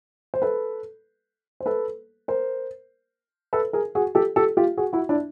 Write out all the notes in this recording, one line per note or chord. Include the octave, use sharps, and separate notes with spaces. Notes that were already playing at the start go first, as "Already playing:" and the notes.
C5
A4 B4
C5
A4 B4
A#4 C5
A4 B4
G#4 A#4
F#4 G#4
G4 A4
G4 A4
F4 G4
F#4 G#4
E4 F#4
D4 E4